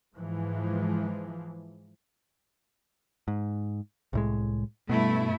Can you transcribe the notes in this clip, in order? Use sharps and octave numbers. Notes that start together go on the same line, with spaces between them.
G#2 E3 F3 G#3
G#2
C2 A2 G#3
G2 B2 A3 E4